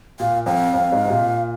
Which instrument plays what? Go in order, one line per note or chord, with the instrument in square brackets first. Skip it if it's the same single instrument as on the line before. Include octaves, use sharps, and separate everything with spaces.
[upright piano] A#2 [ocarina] F5
[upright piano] F2 [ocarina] F5
[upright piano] F2
G#2
C3
A#2